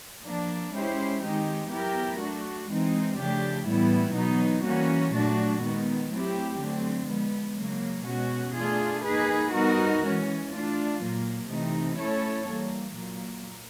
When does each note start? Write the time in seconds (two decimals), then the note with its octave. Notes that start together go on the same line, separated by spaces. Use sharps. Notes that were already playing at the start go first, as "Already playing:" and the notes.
0.24 F3 A#3 D4
0.73 G#3 C#4 E4 G4 C5
1.22 D#3 G#3 C4 D#4 G4
1.71 F#3 B3 E4 G4 A#4
2.19 A3 D4 F#4
2.69 E3 G#3 C4 D#4
3.17 C#3 F3 A3 D4 G4
3.66 A2 E3 G3 B3 E4
4.15 B2 F#3 B3 D#4
4.65 E3 G3 A#3 C#4 F#4
5.14 A#2 F#3 A3 D4 F#4
5.62 D#3 G#3 B3
6.11 F#3 A3 C4 E4 G4
6.59 D3 F#3 A3 C4
7.09 F3 G#3 B3
7.57 C#3 F#3 A#3
8.06 B2 G#3 C#4 F#4
8.55 A3 D4 F4 G#4
9.05 A#3 D#4 G#4 B4
9.53 G3 B3 D#4 F#4 A#4
10.02 E3 G#3 C#4
10.51 A3 D4 F4
11.00 A#2 F#3 A#3
11.49 C3 E3 A3 C4 D#4
11.97 A3 C#4 E4 A4 C#5
12.47 E3 G3 A#3
12.95 A#2 F#3 A#3